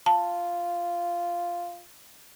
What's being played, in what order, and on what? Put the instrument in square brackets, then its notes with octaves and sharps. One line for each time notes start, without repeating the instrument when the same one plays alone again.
[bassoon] F4 [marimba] A5